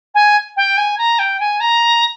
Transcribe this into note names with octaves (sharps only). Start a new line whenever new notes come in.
G#5
G5
G#5
A#5
G5
G#5
A#5